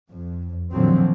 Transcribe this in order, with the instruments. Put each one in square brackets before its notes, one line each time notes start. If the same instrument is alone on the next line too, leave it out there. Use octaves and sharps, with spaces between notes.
[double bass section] F2
A#2 D3 D#3 F3 F#3 C4